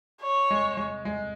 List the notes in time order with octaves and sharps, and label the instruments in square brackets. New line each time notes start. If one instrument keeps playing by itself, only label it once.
[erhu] C#5
[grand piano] G#3
G#3
G#3